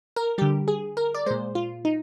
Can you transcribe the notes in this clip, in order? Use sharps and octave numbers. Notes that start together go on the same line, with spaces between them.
A#4
D3 G3 G4
G#4
A#4
D5
A#2 G#3 C5
F4
D#4